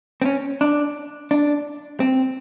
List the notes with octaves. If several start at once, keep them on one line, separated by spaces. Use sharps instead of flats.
C4
C#4
D4
D4
C4